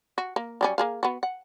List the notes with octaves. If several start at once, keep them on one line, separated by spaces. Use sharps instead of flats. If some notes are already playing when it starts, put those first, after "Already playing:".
F#4
A#3
F#3 G3 C#4
A#3 G#4 F5
B3 F#4
F#5